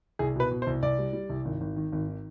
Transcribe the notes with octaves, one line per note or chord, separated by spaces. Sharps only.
C2 G#4
B2 B4
B2
C5
C2
C2 D5
G3
G3
C2
G#1
G#1
D#3
G#1
D#3